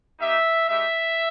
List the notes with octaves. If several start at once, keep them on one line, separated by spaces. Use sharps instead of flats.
A#3 D#4 G4 E5
G#3 D#4 G4 E5